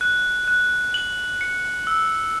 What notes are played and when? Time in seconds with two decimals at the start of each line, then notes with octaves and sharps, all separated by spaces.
0.01 F#6
0.48 F#6
0.94 F#7
1.41 C#7
1.87 E6